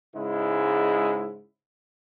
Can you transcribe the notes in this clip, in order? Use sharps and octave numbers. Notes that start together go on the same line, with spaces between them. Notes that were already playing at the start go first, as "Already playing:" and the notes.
G#2 C#3 G#3 E4